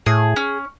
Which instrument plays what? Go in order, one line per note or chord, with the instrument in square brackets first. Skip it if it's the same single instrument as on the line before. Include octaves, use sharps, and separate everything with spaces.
[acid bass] A2 [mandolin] G#4
[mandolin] C#4